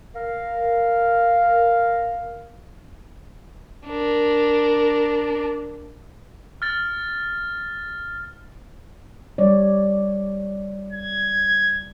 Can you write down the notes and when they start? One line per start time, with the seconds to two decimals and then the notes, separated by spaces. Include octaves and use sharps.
0.15 A#4 F5
3.88 D4 A#4
6.62 F6 A6
9.38 G3 C#5 D5
10.93 G#6